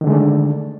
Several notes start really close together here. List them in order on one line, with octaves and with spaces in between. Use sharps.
D#3 D3 G#3 A3 D4